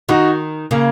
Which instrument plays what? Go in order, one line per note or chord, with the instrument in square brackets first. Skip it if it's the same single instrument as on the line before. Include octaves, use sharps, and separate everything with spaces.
[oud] D#3 [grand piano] D#4 F#4
[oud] C#3 [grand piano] A#3